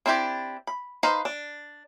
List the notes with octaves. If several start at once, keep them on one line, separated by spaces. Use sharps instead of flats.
C4 D4 E4 G4 D5
B5
D#4 B4 C5 F5 A#5
D4